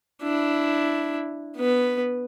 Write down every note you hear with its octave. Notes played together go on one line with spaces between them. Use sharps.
D4 E4
B3 B4